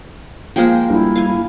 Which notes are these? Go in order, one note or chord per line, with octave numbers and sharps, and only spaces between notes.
F3 G#3 A#3 G#4 G5
G2 E4
F5 G#5